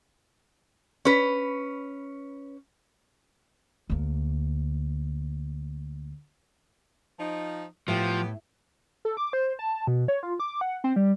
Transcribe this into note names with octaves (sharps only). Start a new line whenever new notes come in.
C#4 B4
D2 A#3
F3 D#4
A2 F3 B3 G4
A4
D6
C5
A5
B2
C#5
F4
D6
F#5
C4
G3